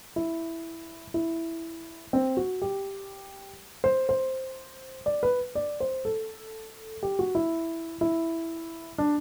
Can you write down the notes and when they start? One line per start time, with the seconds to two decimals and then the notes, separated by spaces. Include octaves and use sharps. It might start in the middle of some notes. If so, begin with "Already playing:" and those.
0.16 E4
1.14 E4
2.13 C4
2.37 F#4
2.62 G4
3.84 C5
4.09 C5
5.06 D5
5.23 B4
5.55 D5
5.80 C5
6.05 A4
7.03 G4
7.19 F#4
7.35 E4
8.01 E4
8.98 D4